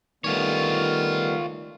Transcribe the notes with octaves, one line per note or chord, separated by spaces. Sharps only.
D#3 G3 A3 B3 F4 C#5